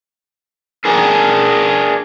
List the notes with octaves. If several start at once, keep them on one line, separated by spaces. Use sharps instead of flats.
D4 G#4 A#4